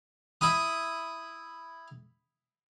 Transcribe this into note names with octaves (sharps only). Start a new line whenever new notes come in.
E4 B5 D#6